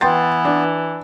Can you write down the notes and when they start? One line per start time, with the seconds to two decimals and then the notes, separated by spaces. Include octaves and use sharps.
0.01 E3 B3 G5 C6 A6
0.45 D4